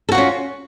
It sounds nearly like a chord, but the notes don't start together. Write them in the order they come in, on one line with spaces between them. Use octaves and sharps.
A4 F#4 F4 C#4